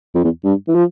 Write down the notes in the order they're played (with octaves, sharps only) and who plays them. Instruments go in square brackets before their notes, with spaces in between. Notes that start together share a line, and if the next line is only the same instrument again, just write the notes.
[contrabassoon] F2
E2
G2
E3
F3